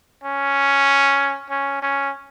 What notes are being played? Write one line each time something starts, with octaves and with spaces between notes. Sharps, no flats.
C#4
C#4
C#4